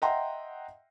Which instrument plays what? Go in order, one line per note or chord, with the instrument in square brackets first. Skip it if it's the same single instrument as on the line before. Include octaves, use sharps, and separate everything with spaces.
[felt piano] D#5 E5 F#5 G5 A#5 C6